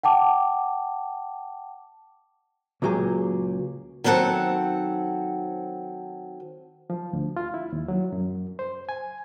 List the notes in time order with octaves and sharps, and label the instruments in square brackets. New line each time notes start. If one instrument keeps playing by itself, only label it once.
[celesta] F#5 G5 A5 D6
[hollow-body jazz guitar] C#2 A#2 F#3 G4 G#4
[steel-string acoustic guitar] D#3 F#3 C4 A4 F#5
[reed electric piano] F3
D2
F4
E4
D#2
F#3
F#2
C5
G#5